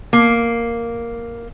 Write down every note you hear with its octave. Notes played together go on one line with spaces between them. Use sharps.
A#3